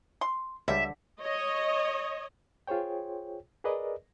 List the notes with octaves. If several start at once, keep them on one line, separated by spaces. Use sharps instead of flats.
C6
C#2 D3 G3 E5
C#5 D#5
F4 G#4 C5 C#5 G5
G#4 A#4 B4 D5 D#5